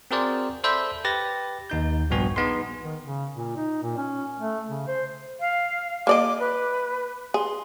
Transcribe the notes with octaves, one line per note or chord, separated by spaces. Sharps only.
C4 F#4 G#4 A#4 C5 D5
A4 C5 D5 E5 B5 G6
G4 B4 A6 A#6
D#2 D#4 G6
A#1 G2 B3 F#4 G#5
B3 D#4 G#4 C6
D#3
C#3
A#2
D#4
A#2
C#4
A3
C#3
C5
F5
A#3 D5 D#5 D6
B4
G#4 C6